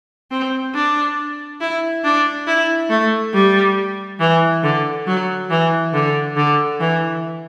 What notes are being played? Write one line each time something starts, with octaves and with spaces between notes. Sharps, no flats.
C4
D4
E4
D4
E4
A3
G3
E3
D3
F#3
E3
D3
D3
E3